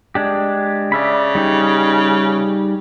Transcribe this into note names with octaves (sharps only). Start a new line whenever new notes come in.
G#3 D4 G4
C#3 D5 E5 B5
G3 D#4 G4